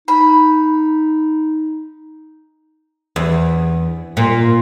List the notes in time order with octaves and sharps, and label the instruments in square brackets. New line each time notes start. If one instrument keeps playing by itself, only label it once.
[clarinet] D#4 [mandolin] B5
[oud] E2
A#2